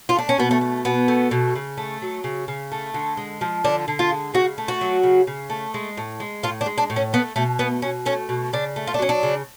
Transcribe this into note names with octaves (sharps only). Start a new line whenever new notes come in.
F4
A3 D4
C#4
B2 B3
A3
A3
B2 B3
A3
B2
C#3
A3
F#3
C#3
C#3
A3
D3
G#3
F3
D3 D4
D3
F4
G#3
C#3 F#4
A3
F#4
F#3
C#3
C#3
A3
G#3
A2
G#3
A2 F4
D4
G#3
D4
A2
C#4
A3 B3
B2 A3
A3 B3
B2 C#4
A3 C#4
B2
C#3 D4
A3
F4
D4
F#3 C#4
D4
C#3